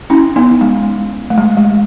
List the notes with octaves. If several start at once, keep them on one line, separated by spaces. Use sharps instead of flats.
C#4 E4
B3 D#4
G#3
A3
G#3
G#3